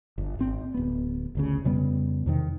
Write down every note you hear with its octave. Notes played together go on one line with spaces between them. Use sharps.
G1
G#1 C4
D1 B3
G1 D2 C#3
F2 C#3 G3 B3
E2 C3 D#3